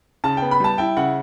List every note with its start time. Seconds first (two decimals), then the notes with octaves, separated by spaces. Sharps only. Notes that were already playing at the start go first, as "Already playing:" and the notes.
0.24 C#3 A5
0.37 B3 G5
0.51 B5
0.60 G3 A5
0.78 E4 G5
0.97 C#3 F#5